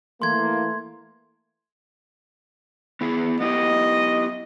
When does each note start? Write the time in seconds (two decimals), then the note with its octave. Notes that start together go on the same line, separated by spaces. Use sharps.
0.22 E3 A3 A#3 C6 G#6
3.01 B3 E4 G#4
3.40 B3 E4 G4 D#5